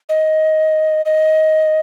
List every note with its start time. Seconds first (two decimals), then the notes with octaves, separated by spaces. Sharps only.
0.09 D#5
1.05 D#5